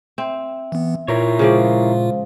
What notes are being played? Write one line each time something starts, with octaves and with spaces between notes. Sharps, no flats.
C4 E5
E3 B3
A#2 E4 F4 A#4 C#5
C#3 F3 G#3 C5 D5 F5